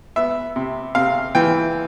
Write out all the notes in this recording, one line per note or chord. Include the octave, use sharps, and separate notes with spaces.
B3 E5
C3
C3 F5
E3 G5